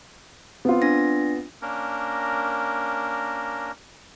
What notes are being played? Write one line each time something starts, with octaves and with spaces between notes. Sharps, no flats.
B3 C4 F4
D4 A#6
A#3 C#4 D4 A#4